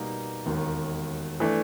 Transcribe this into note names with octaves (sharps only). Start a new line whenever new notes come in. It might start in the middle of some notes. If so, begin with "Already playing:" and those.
Already playing: B2 G3 A#3 D#4
E1 D#2 D#3
E3 A3 D4